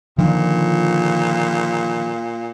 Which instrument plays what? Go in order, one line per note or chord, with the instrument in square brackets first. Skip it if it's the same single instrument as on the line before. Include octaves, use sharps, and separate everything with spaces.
[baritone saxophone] A#2 [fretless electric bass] D3 D#3 F3